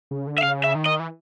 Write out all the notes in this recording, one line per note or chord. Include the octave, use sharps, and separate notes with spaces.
C#3
D3
E5
C#3 F5
E5
D#3
D#5
E3